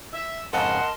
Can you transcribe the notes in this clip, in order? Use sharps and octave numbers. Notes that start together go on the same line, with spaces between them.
E5
F2 G#2 C#3 A#4 D#5 F#5 A5 C6